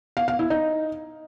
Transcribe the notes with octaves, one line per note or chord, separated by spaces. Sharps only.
F5
F5
E4
D#4